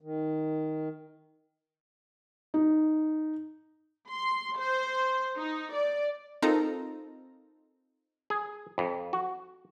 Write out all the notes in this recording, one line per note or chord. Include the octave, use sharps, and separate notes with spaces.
D#3
D#4
C6
C5
D#4
D5
C4 D#4 F4 A4 A#4 A#5
G#4
F2
F#4